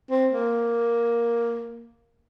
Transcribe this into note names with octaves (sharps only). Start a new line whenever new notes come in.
C4
A#3